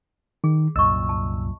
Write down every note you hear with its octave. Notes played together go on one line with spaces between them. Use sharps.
D#3 G#4
C2 F#2 A#2 D#5 C#6 E6
A5